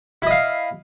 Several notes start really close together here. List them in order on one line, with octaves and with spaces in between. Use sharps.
E4 D#5 F5